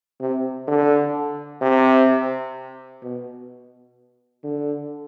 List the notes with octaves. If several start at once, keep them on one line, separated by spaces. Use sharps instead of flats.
C3
D3
C3
B2
D3